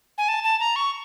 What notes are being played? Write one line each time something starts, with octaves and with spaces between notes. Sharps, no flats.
G#5
A5
A5
A#5
C#6